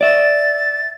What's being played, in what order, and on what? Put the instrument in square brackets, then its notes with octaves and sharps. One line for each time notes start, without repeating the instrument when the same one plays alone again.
[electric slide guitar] D5 E5 [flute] A6